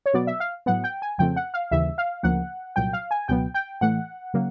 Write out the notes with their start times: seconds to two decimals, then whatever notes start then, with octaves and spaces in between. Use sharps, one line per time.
0.06 C#5
0.13 B2 F#3 B3 D5
0.27 E5
0.40 F5
0.66 A2 F#3 B3 F#5
0.84 G5
1.02 G#5
1.18 F2 C#3 F3 A3 C4 G5
1.36 F#5
1.54 F5
1.71 D#2 C#3 E3 G3 E5
1.98 F5
2.23 D2 C#3 F3 A#3 F#5
2.76 C2 A#2 F#3 G5
2.93 F5
3.11 G#5
3.28 C#2 B2 F#3 B3 G5
3.54 G5
3.81 A2 E3 A3 F#5
4.34 C#3 F#3 A#3